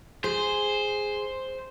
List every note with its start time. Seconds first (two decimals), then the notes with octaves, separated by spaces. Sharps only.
0.24 G#4 C5